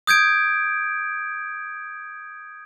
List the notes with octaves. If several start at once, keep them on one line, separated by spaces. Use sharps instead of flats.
D#6 G6 G#6 D7